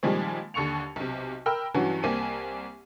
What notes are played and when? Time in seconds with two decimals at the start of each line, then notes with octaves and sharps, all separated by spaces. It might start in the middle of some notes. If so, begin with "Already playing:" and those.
0.03 A#2 D#3 F3 G3 G#3 C4
0.54 D#2 D3 C#6 C#7 F7
0.96 B1 C3
1.46 A#4 G5 B5 E6
1.74 G2 E3 F#3 C#4 F#4
2.03 C2 A#3 C4 G#5 D#7